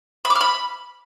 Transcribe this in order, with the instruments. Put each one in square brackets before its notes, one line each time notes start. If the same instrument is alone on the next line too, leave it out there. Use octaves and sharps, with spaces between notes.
[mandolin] B5
D6
F6
B5